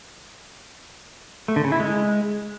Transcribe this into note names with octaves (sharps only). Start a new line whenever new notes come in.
A3
D3
C#3
E4
G#3